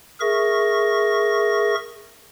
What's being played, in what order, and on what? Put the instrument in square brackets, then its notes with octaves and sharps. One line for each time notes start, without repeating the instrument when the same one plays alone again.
[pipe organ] G#4 A#4 E5 C#6 A#6